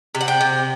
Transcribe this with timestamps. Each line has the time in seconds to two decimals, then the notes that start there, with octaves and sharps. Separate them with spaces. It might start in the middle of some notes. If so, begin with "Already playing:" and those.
0.15 C3
0.21 F#5
0.28 G5
0.41 C3